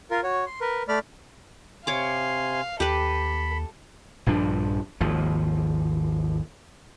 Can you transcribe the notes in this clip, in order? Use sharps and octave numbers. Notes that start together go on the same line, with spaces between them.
F4 A#4
F#4 C#5
C6
A#4 B4
A3 D5 B5 F6
C3 C#5 F5 G#5 C6 D6
D#2 G4 A4 B4 B5
A#1 G2 F3 D4
G#1 D#2 F3